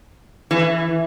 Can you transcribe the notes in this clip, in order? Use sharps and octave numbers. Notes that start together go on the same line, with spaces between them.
E3